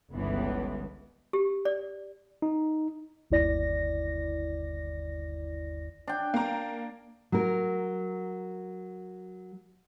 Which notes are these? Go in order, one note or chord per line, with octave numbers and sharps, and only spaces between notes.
G1 C#2 E3 B3
G4
D5
D#4
G1 D#2 E4 D5 A#6
D4 G5
A#3 A#5
F#3 A#4